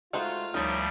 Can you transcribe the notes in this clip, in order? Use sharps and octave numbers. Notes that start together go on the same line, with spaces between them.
G#3 A3 D#4 F4 F#4 C5
D2 F3 G3 D#4 A#4 C#5